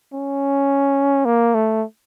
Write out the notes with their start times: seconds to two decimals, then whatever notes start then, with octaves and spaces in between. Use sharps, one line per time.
0.13 C#4
1.25 A#3
1.54 A3